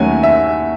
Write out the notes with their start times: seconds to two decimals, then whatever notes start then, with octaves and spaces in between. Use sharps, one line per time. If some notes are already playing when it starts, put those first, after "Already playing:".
Already playing: D#2 D#3 F#3 A3 C#4 G#5
0.23 E5